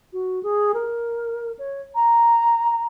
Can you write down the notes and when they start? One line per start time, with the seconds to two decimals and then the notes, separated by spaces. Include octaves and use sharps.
0.13 F#4
0.43 G#4
0.74 A#4
1.59 C#5
1.95 A#5